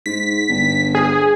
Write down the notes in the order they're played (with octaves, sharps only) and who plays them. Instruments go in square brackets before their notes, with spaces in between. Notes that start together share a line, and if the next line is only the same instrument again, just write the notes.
[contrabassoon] G#2 [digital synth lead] B6
[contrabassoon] G1
[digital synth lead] G#4